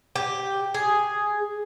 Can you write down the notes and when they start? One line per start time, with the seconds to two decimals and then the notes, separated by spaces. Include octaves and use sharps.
0.16 G4
0.74 G#4